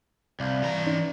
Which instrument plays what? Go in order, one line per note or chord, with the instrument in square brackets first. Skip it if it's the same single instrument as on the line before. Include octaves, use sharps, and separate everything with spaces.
[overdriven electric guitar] C2 [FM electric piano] D5 F5 A5
[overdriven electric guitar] E3 A#5
[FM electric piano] C#4 D#4 D5